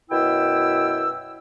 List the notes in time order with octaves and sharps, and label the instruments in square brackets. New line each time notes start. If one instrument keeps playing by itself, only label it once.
[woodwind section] F#2 B2 E4 B4 G5 E6